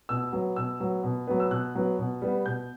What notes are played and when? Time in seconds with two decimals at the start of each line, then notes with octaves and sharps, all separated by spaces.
0.09 B2 E6
0.33 F#3 B3
0.56 B2 E6
0.80 F#3 B3
1.04 B2
1.27 F#3 B3
1.40 E6
1.51 B2 F#6
1.75 F#3 B3
1.99 B2
2.22 G3 B3
2.46 B2 G6